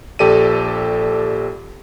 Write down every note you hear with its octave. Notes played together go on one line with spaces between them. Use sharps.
A#1 G4 A4 D5 D#7